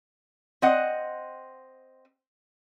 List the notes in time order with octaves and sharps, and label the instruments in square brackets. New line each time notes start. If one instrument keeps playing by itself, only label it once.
[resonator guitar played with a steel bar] C4 D#5 F#5